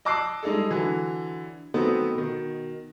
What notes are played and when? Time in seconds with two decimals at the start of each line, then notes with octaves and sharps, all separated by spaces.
0.05 D#5 A5 D6 E6 F#6 C7
0.43 G3 G#3 D#4 G#4 A4
0.70 D3 E3 F#3
1.74 D#3 F#3 A3 B3 C4 D#4
2.15 B2 D#3